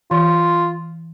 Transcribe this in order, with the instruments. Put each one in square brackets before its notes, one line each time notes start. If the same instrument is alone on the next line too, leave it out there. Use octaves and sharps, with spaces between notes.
[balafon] E3 [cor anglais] F4